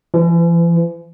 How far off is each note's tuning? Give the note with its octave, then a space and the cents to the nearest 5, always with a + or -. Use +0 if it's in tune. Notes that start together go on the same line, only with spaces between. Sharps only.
E3 +45